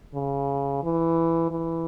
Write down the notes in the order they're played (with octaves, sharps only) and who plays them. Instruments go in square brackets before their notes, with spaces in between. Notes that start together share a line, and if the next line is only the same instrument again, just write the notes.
[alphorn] C#3
E3
E3